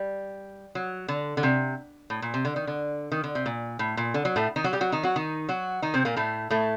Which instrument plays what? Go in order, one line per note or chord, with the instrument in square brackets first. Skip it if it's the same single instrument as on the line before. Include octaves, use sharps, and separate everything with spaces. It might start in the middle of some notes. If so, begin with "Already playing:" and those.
Already playing: [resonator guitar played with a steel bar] G3
F#3
D3
D3
C3
A2
A#2
C3
D3
D#3
D3
D#3
D3
C3
A#2
A2
A#2
D3
F#3
A2 A3
D#3 D#4
F#3 F#4
G3 G4
F#3 F#4
D#3 D#4
F#3 F#4
D#3 D#4
F#3 F#4
D#3 D#4
C3 C4
A#2 A#3
A2 A3
A2 A3